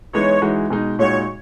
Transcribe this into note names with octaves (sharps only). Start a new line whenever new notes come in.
E3 G#3 B3 D#4 C#5
E3 G#3 D#4 F#4
B2 G#3 D#4
A#2 G#3 D#4 F#4 C#5